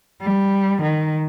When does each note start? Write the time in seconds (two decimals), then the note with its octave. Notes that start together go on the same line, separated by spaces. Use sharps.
0.22 G3
0.83 D#3